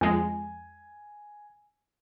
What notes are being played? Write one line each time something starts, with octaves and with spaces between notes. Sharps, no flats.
F2 G#3 G#5